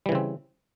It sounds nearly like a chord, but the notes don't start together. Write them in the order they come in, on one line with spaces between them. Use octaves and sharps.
G3 E3 C#3 C4